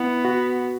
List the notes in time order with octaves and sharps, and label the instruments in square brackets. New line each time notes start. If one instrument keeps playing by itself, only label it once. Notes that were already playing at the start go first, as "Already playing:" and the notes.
Already playing: [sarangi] B3 [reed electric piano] E4
[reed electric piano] F#4